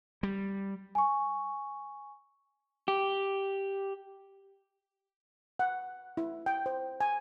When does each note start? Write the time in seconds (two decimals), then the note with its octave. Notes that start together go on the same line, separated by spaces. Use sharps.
0.23 G3
0.95 G#5 C#6
2.88 G4
5.59 F#5
6.17 E4
6.46 G5
6.66 C5
7.00 G#5